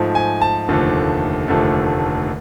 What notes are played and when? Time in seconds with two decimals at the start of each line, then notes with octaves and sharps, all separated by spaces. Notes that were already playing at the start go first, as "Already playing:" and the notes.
Already playing: G#2 F3 A3
0.15 G#5
0.41 A5
0.68 F1 D#2 D3 F3 A3
1.48 F1 D#2 D3 F3 A3